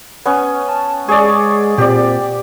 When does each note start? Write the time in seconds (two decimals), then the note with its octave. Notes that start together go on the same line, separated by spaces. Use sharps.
0.26 B3 C#4
0.69 A5
1.08 G#3 G#4 C#5 D5 C#6
1.78 A#2 C4 G4 D5